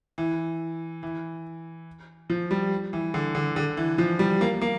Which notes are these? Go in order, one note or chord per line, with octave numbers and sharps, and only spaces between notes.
E3
E3
F3
G3
E3
D3
D3
D3
E3
F3
G3
A#3
A#3